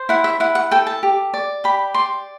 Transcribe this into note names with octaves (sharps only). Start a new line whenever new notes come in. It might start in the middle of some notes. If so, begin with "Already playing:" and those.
Already playing: C5
E4 F#5
E5
E4 F#5
F#5
A4 G5
A5
G4
D5
G4 B5
D5 C6